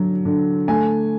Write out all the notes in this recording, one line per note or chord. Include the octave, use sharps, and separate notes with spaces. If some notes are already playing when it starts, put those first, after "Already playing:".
Already playing: D3 F#3
D3
A3 G#5